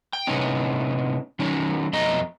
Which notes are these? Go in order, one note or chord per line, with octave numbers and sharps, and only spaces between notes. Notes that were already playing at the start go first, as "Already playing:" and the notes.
G5
A2 C3 G#3 B3 C#4 D#4
D#3 F#3 C#4 D#4
F2 B2 A3 D#5 A#5